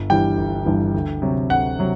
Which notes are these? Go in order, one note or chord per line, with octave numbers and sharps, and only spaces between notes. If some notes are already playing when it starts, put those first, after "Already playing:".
Already playing: G1
G2 E3 G3 G5
G1
G2 E3 G3
D2
C3 F#3
D2 F#5
C3 F#3